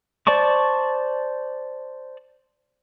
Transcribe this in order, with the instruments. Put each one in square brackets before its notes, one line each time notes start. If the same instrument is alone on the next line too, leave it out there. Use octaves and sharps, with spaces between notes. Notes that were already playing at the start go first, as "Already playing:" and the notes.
[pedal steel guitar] C5 D5 A5 C#6 D6